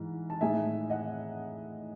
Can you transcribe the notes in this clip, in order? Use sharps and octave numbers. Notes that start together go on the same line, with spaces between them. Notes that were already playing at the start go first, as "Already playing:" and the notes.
Already playing: G#2 E3
A5
A2 G#3 D#4 E5 G#5
D#5 F#5